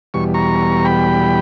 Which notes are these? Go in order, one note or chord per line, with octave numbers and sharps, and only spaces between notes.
E2 B2 G3 C#6
A#5 C#6
G5 B5